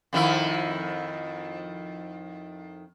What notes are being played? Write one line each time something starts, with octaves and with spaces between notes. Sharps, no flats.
F2 D#3 E4